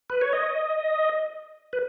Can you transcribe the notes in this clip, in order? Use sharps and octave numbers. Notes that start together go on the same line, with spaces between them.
B4
C#5
D#5
B4